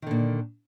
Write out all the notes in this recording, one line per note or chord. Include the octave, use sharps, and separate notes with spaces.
A#2 D3 D#3